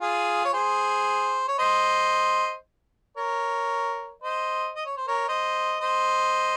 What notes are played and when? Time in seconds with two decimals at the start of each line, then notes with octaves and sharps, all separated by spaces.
0.01 F4 G#4
0.45 C#5
0.53 G#4 C5
1.48 C#5
1.59 C5 D#5
3.17 A#4 C#5
4.22 C5 D#5
4.75 D#5
4.86 C#5
4.97 C5
5.07 A#4 C#5
5.28 C5 D#5
5.80 C5 D#5